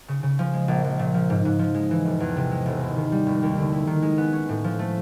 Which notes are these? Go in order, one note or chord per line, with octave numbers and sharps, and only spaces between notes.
C#3
C#3
F3
G#3
A#1
A#1
A#2
F3
G#2
G#2
F3
G#3
E3
E1
E2
C3
G#3
E1
D#2
D#3
G3
F1
D#2
D3
E4
D#3
G#3
B3
C#4
A2
F3
A3